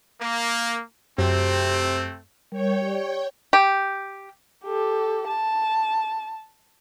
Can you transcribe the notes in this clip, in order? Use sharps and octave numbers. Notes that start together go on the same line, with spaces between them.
A#3
F#2 C3 A3 C4
G3 A#4 C#5 G5
G4 D5
G4
G4 A4
A5